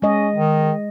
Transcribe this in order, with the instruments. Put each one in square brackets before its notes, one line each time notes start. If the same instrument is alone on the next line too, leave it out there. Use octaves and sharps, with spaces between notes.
[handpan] G#3 D#5 [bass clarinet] C#4
[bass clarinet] D#3